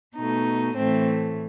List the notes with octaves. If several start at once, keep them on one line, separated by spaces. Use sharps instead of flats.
B2 A3 D#4
A2 E3 A3 C4